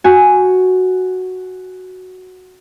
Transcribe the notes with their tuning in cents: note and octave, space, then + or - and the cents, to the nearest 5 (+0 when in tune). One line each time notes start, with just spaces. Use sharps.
F#4 +0 G#5 +0